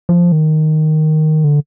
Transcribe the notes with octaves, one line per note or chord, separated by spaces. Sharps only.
F3
D#3
D3